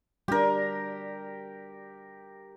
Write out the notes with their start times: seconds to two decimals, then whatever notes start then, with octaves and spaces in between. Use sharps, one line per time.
0.28 G3 D4 G4 A#4